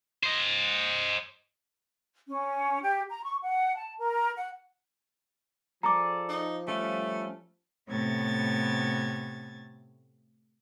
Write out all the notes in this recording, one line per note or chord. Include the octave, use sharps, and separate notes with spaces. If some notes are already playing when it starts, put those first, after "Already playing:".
C5 D#5
C#4
G4
A#5
C#6
F#5
A5
A#4
F#5
F3 G#4 A4 D5 A#5 D6
D#4
G3 A3 C#4 F5
A2 C3 A3 B3 G#6 A6